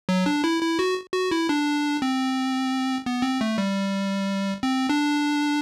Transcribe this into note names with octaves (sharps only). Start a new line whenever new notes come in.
F#3
D4
E4
E4
F#4
F#4
E4
D4
C4
B3
C4
A3
G3
C4
D4